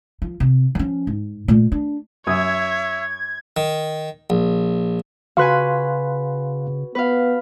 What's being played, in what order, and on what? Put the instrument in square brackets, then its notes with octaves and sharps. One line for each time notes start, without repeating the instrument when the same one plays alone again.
[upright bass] F3
C3
F3 C#4
G#2
A#2 A3
D4
[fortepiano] F#2 D#6 [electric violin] C#5 [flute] E5 [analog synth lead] G#6
[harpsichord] D#3
A#1
[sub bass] C#3 [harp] F#4 B4 G#5 [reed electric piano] F5 C6 F#6
[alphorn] B3 [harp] B4 F5